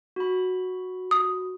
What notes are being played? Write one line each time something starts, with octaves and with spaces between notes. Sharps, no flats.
F#4 B5
D#6